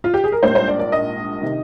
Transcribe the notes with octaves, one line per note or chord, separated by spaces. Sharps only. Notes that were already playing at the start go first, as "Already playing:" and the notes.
F4
G4
G#4
A#4
A#1 G#2 G3 A#3 C5
C5
D5
D5
D#5
C3 D#3